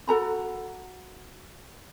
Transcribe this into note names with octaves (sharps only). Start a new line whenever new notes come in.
F#4 A4 A#5 B5